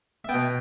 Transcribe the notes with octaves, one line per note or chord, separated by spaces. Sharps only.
E5
B3 G5
B2